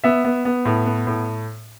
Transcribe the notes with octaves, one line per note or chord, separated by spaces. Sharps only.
B3 E5
B3
B3
A2
B3
A2